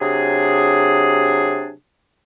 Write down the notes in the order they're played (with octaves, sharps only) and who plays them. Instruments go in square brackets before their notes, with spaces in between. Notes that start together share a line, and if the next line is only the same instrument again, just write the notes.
[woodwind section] C3 F#3 D4 G#4